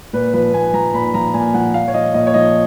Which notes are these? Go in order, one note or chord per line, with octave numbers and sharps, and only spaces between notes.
A#2 B4
F3 B4
A#2 G#5
F3 A#5
A#2 B5
F3 A#5
A#2 G#5
F3 F#5
A#2 F5
C#5
F3 D#5
A#2 D#5
C#5
F3 D#5